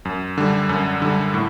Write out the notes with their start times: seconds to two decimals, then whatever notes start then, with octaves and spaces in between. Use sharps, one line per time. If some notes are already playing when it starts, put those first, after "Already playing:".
0.05 F#2
0.38 D3 G3
0.69 F#2
1.02 D3 G3
1.34 A2